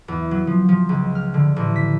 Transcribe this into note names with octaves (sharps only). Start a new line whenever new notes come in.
E2
F#3
F3
F3
C#2
F6
D3
A1
B6